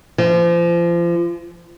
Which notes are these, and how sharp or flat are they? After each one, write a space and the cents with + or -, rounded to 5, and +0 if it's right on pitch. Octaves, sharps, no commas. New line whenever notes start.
F3 -30